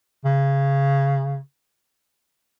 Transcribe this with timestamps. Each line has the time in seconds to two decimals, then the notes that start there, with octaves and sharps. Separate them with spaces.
0.25 C#3